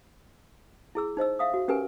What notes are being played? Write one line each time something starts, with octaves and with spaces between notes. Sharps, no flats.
E4 G#4 E6
D#4 C5 D#5 E6
E5 F5 D#6
F#4
C#4 G4 A#4 B4 G#5